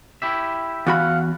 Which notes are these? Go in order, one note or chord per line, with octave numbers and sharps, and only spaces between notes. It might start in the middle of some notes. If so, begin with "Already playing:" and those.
E4 G4 E5
E2 F#4 F5 F#5 B5